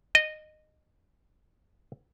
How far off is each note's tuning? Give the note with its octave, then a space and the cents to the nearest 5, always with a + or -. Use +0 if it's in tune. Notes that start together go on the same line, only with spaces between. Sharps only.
D#5 -15